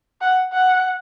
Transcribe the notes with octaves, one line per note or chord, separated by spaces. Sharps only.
F#5
F#5